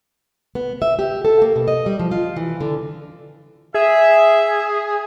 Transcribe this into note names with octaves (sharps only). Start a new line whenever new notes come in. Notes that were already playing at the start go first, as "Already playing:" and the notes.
B3
E5
G4
A4
A#3
B2
D#5
G3
F3
F4
E3
D3
G#4 E5